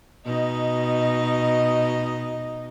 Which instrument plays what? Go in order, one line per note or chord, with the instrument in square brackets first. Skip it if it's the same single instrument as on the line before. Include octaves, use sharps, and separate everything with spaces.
[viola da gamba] B2 D#4 D#5